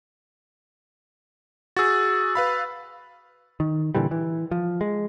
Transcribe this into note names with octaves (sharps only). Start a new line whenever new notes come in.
F#4 G#4 E6 A6
B4 F5 B5
D#3
A#2 D3 E3 G3
E3
F3
G#3